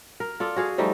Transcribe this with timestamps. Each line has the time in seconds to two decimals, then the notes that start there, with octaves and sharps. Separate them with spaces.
0.20 A#4
0.40 F4 A4 D5
0.56 F#4 G#4 F5
0.78 F3 G3 A3 D#4